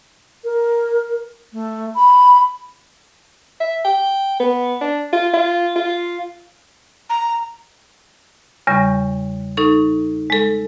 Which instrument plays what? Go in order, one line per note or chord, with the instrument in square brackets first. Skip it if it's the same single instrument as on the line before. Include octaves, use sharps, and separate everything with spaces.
[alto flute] A#4
A3
B5
[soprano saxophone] E5
G5
B3
D4
F4
F4
F4
[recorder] A#5
[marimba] E2 C#3 G3 C#6
D#4 A4 C#6
G#3 A4